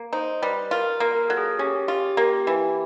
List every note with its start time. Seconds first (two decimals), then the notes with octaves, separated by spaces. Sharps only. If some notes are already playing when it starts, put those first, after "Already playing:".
Already playing: A#3
0.13 D#4 C5
0.42 G3 B4
0.71 F4 A#4
1.00 A#3
1.15 A#4
1.28 F#3 A4
1.37 G#4
1.59 C#4 G4
1.88 F4 G4
2.17 A#3 G4
2.47 E3